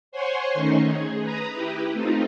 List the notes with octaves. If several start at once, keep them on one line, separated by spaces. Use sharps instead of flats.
C5 C#5 F#5 G#5 C6 C#6
D#3 A3 C#4 D#4
G#4
B4 A#5 D#6
E4 G4 B4
A3 C4 D#4 F4